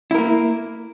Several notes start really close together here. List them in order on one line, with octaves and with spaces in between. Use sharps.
E4 A#4 A#3